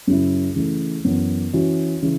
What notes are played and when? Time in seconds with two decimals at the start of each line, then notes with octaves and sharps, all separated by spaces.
0.07 F#2 C#3 F#3 C#4 E4
0.56 C#3 E3 A3
1.04 F#2 E3 B3
1.53 E3 C#4 F#4
2.02 C#3 E3